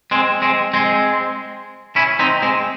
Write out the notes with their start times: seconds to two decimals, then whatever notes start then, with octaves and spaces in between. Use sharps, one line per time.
0.11 G#3 C4
0.42 G#3 C4
0.74 G#3 C4
1.96 C#4 E4
2.19 C4 D#4
2.42 G#3 C4